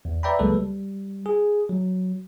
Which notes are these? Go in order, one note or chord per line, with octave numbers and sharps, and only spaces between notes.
E2
B4 D5 E5 G5 A#5 B5
C#2 F#3 G#3 A#3 A4 B4
G3
G#4
F#3